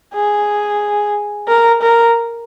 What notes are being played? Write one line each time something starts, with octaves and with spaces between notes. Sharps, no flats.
G#4
A#4
A#4